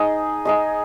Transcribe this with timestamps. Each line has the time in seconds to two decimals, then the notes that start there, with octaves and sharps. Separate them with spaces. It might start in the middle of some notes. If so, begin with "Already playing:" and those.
Already playing: D#4 G#4 D#5
0.45 D#4 G#4 D#5